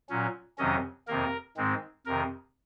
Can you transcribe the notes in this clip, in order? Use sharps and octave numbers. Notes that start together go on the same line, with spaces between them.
A#2 F#3 C#4
F2 C3 D#3 F#3 C#4 D#5
F2 C3 D#3 A#3 A#4
G#2 D#3 G#3 C4
F2 C3 D#3 A#4